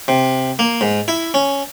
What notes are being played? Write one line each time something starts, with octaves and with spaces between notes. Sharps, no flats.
C3
A#3
G#2
E4
C#4